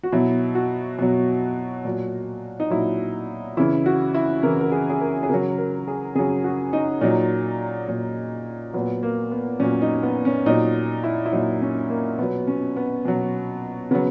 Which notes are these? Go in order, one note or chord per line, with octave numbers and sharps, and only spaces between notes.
F#4
B2 F#3 E4
F#4
B2 F#3
A#2 F#3
D#4
A#2 F#3 E4
C#3 E3 E4
F#4
E4
C#3 E3 A#4
A#4
G#4
G#4
A#4
G#4
C#3 F#3 A#4
A#4
G#4
C#3 F#3 G#4
F#4
D#4
A#2 F#3 D#4
A#2 F#3
A#2 F#3 B3
A#3
B3
A#2 F#3 C#4
D#4
B3
C#4
A#2 F#3 D#4
E4
E4
A#2 F#3 D#4
C#4
A#3
B2 F#3 B3
C#4
B3
B2 F#3
C#3 F#3 B3